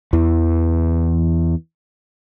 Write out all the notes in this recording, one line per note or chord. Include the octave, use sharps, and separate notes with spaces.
E2 E3